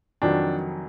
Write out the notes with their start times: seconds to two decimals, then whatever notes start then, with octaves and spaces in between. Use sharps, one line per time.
0.22 F1 F2 D#3 F#3 D4